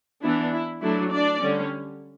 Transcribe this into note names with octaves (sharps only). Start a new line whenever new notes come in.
E3 B3 D4 E4
E4
F#3 A3 D4 E4
D4 D5
D3 G3 C#4